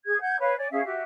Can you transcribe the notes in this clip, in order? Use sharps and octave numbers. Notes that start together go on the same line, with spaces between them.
G#4 G#6
F#5 G6 G#6
B4 C#5 F5
C#5 D5 G#5
C#4 G#4 E5 F5
F#4 G4 E5